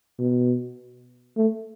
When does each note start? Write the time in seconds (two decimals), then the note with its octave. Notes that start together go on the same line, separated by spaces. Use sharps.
0.19 B2
1.37 A3